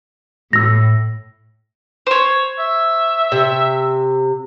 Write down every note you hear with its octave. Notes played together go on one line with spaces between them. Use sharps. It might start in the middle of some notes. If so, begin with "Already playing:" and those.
A2 E6 A#6
C5 C#5
E5
C3